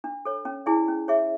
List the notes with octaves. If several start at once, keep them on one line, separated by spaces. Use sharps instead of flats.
D4
A4 C#5
C#4
E4 G#4 D5 G#5
C#4
G#4 C#5 E5